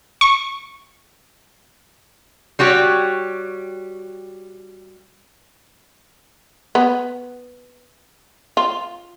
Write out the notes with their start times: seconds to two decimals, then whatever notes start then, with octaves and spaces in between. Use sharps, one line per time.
0.21 C#6
2.59 G3 F#4 G4 C#5
6.75 B3
8.57 F4